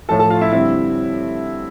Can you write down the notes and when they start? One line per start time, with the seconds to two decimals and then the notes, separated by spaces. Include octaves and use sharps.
0.09 A2 F3 A3 A4 A5
0.19 A4 A5
0.30 F4 F5
0.41 E4 E5
0.52 D3 G3 C4 E4 E5